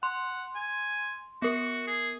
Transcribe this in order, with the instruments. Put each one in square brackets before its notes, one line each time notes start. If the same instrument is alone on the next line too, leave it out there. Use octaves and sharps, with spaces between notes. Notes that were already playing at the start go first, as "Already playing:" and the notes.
[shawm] F#5 [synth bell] C6
[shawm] G#5
[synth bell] B3 A#4 [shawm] F#4
[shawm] G#4